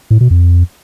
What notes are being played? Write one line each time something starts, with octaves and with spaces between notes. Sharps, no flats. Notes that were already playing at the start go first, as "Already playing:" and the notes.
A2
B2
F2